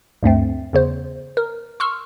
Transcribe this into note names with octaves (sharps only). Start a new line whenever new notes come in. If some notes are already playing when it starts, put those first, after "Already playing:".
D2 G2 A3 C4
E2 C#3 C5
A#4
C6 C#6 E6 F6